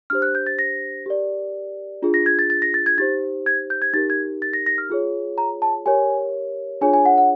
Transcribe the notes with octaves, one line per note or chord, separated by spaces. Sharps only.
D4 G4 C5 F6
F#6
G6
A6
A#6
G4 A#4 D5
D4 F4 G#4
A#6
G#6
A6
A6
A#6
A6
G#6
D#4 G4 C5 A6
G#6
G6
G#6
D#4 G4 A#4 A6
G#6
A6
A#6
A#6
F6
F4 G#4 C#5
A#5
A5
G4 A#4 C#5 G#5
D4 F4 G#4 C#5 G#5
G#5
F#5
F#5